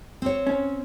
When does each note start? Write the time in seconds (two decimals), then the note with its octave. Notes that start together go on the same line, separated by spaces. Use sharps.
0.22 C4 C#5
0.47 C#4